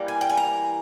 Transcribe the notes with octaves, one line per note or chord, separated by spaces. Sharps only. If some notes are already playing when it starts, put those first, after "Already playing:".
Already playing: E3 G3 A#3
G#5
G5
G#5
A#5